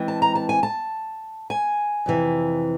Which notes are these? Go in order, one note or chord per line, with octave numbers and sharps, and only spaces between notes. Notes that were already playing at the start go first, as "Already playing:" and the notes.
Already playing: E3 G#3 C4
A5
A#5
A5
G#5
A5
G#5
F2 C3 E3